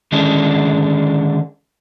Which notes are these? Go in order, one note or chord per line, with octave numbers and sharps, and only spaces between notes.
D3 D#3 G#3 C#4 D4